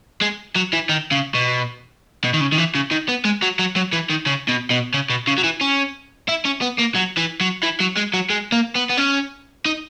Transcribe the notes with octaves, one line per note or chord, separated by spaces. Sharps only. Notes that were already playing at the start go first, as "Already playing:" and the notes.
G#3
F#3
E3
D#3
C#3
B2
B2
D#3
C#3
D#3
E3
C#3
D#3
B3
G#3
F#3
F#3
F#3
E3
D#3
C#3
B2
B2
C#3
B2
C#3
F#3
E3
C#4
E4
C#4
B3
A#3
F#3
E3
F#3
E3
F#3
G#3
F#3
G#3
A#3
B3
B3
C#4
D#4